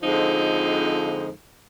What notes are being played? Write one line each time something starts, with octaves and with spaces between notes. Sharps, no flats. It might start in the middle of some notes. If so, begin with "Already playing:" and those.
F2 D3 F3 G#3 C4 D#4